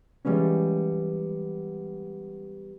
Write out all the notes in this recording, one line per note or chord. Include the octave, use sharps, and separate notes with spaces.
E3 G3 G#3 B3 C#4